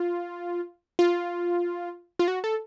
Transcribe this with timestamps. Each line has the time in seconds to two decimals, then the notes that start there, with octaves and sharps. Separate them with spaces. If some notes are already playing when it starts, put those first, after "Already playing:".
Already playing: F4
0.99 F4
2.19 F4
2.28 F#4
2.44 A4